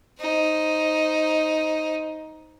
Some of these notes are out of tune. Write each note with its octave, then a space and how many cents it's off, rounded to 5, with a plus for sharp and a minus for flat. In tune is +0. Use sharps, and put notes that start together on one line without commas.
D#4 +5 C5 +0